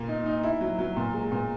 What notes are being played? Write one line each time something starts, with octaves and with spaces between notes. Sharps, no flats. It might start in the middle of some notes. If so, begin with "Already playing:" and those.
Already playing: A#2 A#3
D#4
D#4
E4
F#3
F#3
A#2
G#3
A#2